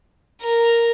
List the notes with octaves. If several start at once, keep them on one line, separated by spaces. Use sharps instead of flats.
A#4